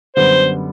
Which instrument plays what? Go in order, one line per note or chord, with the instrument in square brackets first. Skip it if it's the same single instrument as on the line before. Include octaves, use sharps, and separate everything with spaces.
[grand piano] F#2 D3 G3 B3 [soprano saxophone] C5